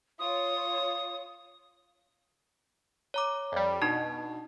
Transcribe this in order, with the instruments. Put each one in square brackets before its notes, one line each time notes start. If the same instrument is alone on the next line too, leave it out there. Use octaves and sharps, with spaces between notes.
[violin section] F4 C#5 [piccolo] D#6
[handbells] C#5 A#5 D6
[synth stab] F2 G3
[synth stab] B2 [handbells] D4 D#4 A5